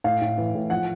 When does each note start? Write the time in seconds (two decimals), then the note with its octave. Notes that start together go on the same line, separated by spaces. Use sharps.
0.04 A2 F5
0.21 A2
0.38 E3
0.55 A2
0.70 F3 F#5